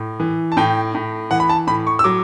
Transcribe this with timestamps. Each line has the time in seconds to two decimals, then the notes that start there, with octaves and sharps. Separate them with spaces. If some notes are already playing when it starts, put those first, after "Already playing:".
Already playing: A2
0.20 E3
0.52 A5
0.57 A2 G5
0.95 A2
1.31 E3 F#5
1.40 B5
1.49 A5
1.67 A2 B5
1.87 C#6
1.99 E6
2.04 F#3 D6